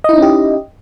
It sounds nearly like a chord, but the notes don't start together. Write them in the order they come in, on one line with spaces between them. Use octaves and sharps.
D#5 E4 D#4 C#4 G4